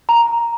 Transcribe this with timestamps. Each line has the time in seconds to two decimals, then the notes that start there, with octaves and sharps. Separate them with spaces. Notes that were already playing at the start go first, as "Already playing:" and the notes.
0.09 A#5